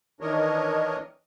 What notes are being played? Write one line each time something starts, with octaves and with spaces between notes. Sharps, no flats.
D#3 E3 D4 A#4 C#5 D#5